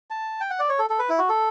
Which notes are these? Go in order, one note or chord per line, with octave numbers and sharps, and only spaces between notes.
A5
G5
F#5
D5
C#5
A4
A4
B4
E4
F#4
A4